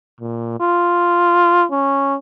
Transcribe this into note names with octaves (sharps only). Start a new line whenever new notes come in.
A#2
F4
C#4